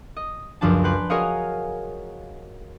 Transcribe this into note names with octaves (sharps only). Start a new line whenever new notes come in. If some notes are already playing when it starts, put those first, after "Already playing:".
D#5
C#2 F#2 F3 D4 A5
B4 G5 C6 F#6
F#4 G#4 A#4 C#5 D#5 F5